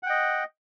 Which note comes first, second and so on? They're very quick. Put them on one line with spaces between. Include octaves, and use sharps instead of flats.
F#5 G5 D#5